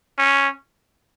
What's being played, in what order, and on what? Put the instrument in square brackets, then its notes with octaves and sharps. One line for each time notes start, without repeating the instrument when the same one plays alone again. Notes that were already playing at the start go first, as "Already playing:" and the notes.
[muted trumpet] C#4